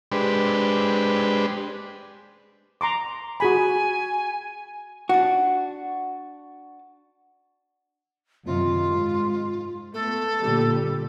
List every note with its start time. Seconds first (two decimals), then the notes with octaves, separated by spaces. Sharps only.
0.12 G#3 D4 G4 B4 C5
2.81 A#5 C6 D6
3.40 F#4 G#4 G#5 B5
5.09 D4 F#4
8.46 F#2 C3 D#3 F4
8.89 G#2
9.94 A3 B3 A4
10.40 A#2 D3 G3